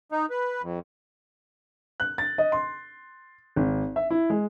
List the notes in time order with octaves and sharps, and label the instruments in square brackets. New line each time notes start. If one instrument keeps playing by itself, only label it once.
[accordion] D#4
B4
F2
[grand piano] F#6
A6
D#5
C6
G#1
E5
E4
G#3